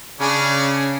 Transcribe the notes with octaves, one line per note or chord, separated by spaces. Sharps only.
C#3 D4 G#4 C#5